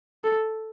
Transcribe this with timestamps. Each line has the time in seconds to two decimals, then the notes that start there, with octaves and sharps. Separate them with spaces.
0.24 A4